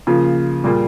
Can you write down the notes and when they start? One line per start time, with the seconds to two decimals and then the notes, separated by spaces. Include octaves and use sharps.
0.07 C#3 F3 A#3 F4
0.64 A#2 G3 A#3 F4 G#4